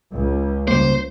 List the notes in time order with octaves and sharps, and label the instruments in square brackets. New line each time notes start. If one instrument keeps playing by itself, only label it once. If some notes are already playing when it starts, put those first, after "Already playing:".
[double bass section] C#2
[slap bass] C#3 G3 A#3 [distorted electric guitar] C5